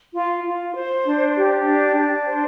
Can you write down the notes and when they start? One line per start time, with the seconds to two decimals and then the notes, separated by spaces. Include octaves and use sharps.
0.13 F4
0.44 F4
0.74 C5
1.05 D4
1.35 G4
1.66 D4
1.97 D4
2.27 C5